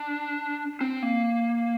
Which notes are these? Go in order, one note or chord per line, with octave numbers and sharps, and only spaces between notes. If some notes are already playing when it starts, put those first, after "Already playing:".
Already playing: D4
C4
A#3